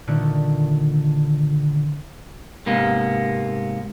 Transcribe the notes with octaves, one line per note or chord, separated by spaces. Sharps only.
A#2 D3 D#3 A3
G#2 C3 A#3 B3